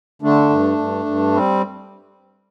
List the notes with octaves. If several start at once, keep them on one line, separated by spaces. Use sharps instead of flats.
D3 A3 D4
G2
G2
G2
G3 C4